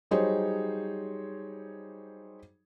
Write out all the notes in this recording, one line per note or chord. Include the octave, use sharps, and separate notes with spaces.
F#3 G3 D#4 G#4 C5 C#5